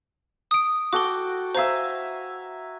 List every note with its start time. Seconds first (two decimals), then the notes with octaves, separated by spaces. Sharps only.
0.51 D#6 D7
0.93 F#4 A4 G5 D6 G7
1.55 C5 E5 F5 G#5 A#5